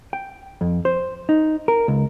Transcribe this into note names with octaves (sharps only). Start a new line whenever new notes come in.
G5
F2
C5
D#4
A#4
C#2